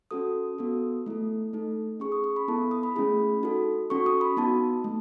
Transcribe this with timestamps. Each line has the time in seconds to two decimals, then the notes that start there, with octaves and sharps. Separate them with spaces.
0.11 C#4 F#4 A4 D#6
0.58 B3 F#4 A4
1.06 A3 E4 A4
1.53 A3 D#4 A4
2.00 C#4 G#4 C#6
2.12 D#6
2.24 C#6
2.36 B5
2.48 B3 E4 A4 A5
2.71 D#6
2.83 B5
2.96 A3 C#4 E4 G#4
3.43 D#4 F#4 A4
3.90 C#4 F#4 A4 C#6
4.06 D#6
4.21 B5
4.37 B3 D#4 F#4 A5
4.84 A3